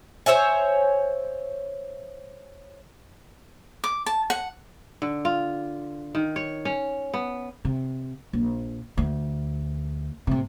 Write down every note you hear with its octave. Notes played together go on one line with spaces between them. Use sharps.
C5 C#5 E5 G#5
D6
A5
F#5
D3
F4
D#3
C#5
C#4
B3
C3
A#1
D2
A2 C3